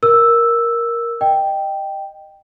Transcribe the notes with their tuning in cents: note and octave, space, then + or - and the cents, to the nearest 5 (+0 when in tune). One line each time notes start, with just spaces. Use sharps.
A#4 +5 E6 +0
D#5 -15 G5 +0